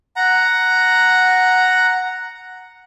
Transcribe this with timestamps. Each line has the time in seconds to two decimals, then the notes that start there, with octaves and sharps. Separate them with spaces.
0.16 F#5 A#5